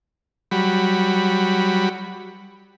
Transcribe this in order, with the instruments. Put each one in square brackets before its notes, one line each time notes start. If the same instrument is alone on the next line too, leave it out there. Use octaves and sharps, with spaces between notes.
[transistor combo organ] F#3 G3 B5